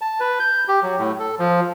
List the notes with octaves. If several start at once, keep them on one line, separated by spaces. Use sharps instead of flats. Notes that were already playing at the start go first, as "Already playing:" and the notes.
A5
B4
G6
G4
F#3
A2
A4
F3